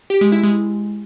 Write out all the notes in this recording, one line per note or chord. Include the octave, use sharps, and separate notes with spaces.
G4
G#3
E4
G#3